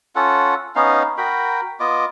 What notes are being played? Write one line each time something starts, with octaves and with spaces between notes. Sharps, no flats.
C#4 F4 A4 F#5
B3 C#4 D#4 F5
F#4 A#4 G5 B5
B3 F4 D#5 D6